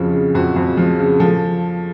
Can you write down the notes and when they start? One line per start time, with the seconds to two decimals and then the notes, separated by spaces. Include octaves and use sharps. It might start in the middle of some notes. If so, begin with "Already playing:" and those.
Already playing: F2 C#3 F3 F#4
0.13 C#3
0.35 F2 F#4
0.56 F2
0.77 F3
0.99 C#3
1.20 F3 A4